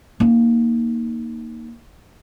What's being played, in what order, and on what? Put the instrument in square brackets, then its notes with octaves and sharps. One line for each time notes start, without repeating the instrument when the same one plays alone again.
[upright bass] A#3 D#4